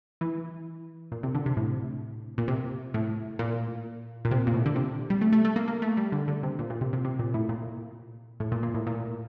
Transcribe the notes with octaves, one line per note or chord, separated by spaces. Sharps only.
E3
A#2
C3
D3
C3
A2
A#2
C3
A2
A#2
A#2
C3
A#2
A2
D3
C3
G3
A3
A3
A3
A#3
A#3
A3
G3
D3
D3
C3
A#2
A#2
C3
C3
C3
A#2
A2
A#2
A2
A#2
A#2
A2
A#2